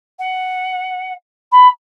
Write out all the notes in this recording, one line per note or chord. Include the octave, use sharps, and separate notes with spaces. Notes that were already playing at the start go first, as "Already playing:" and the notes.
F#5
B5